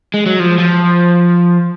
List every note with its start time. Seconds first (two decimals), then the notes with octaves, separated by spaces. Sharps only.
0.14 G#3
0.26 F#3
0.40 F3
0.58 F3